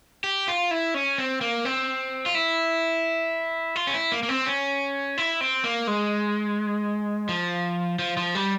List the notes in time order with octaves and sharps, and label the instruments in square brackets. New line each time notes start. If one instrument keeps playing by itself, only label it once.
[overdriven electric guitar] G4
F4
E4
C#4
C4
A#3
C4
F4
E4
F4
C#4
E4
A#3
A#3
C4
C#4
E4
C4
A#3
G#3
F3
F3
F3
G3